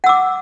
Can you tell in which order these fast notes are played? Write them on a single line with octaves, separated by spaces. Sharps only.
F#5 E6 D6